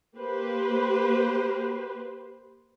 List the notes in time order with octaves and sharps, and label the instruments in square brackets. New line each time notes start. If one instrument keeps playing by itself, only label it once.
[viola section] A#3 G4 B4 C5